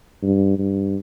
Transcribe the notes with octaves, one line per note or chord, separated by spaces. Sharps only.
G2
G2